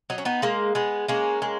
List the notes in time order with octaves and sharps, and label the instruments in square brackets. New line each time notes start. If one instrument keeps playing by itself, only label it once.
[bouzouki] F#3 D#4
C#4
B3 D#4
G#3 A#3
G#3 B3
G#3 A#3 C#4
G#3